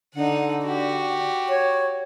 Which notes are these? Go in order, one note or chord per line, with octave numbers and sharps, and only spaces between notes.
D3 D#4 F#5
F#4 G4
C#5